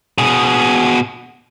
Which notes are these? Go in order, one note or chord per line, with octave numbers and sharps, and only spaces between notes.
B2 G#4